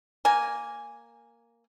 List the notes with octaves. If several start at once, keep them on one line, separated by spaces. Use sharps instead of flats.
A#3 G#5